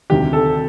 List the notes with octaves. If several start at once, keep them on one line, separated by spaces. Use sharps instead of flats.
D2 C3 D#3 G4
A4